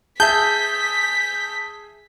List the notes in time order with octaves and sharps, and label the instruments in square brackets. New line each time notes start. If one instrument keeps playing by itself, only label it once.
[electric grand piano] G#4 E5 [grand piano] A5 [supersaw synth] G6 [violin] B6